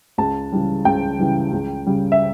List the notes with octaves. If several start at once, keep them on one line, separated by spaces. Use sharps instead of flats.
C#2 A5
C#3 E3 G3
C#2 G5
C#3 E3 G3
C#2
C#3 G3
E5